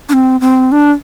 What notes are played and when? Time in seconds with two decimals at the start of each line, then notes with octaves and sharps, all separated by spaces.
0.09 D4
0.13 C4
0.41 C4
0.72 D4